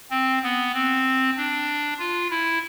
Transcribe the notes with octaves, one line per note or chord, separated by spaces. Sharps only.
C4
B3
C4
D4
F4
E4